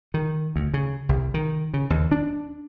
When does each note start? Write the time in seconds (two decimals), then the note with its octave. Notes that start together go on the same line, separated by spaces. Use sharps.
0.14 D#3
0.56 D2
0.74 C#3
1.09 C2
1.34 D#3
1.74 C#3
1.90 D#2
2.12 D4